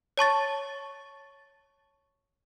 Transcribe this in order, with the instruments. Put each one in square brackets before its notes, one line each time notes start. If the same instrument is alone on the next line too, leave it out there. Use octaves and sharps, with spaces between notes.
[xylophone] C#5 A5 C#6 A6